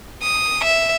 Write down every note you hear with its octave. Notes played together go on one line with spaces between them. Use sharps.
D#6
E5